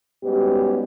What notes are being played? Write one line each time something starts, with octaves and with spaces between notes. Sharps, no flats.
G#2 G3 B3 C#4 F#4 G4